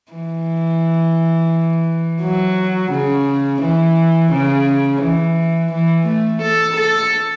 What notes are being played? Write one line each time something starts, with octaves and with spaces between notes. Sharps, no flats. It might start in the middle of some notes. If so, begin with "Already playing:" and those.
E3
F#3
C#3
E3
C#3
E3
E3
A3
A4
A4